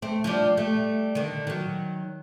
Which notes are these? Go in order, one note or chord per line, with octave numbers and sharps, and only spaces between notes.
A3 C4
F3 G3 D4
G3 A3
D3 D#3
D#3 F#3